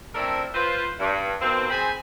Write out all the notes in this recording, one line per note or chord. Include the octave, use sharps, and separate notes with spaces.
A3 C4 D4 E4 A4 A#4
F4 B4 C5
G2
B2 D#3 A#3 C4
C4 G#4 C5 G#5 B5